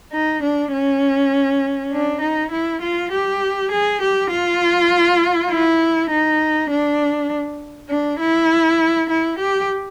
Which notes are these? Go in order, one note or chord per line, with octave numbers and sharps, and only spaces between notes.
D#4
D4
C#4
D4
D#4
E4
F4
G4
G#4
G4
F4
E4
D#4
D4
D4
E4
E4
G4